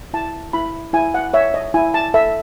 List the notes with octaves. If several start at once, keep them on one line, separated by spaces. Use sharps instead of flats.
E4 A5
E4 B5
E4 G#5
F#5
C#5 E5
D#5
E4 G#5
A5
A4 E5